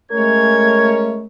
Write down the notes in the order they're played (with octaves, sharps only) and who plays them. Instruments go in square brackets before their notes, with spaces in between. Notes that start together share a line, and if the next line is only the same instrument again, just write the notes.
[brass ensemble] G#3 C#4 C#5 [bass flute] A3 [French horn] A#4 [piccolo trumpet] G#6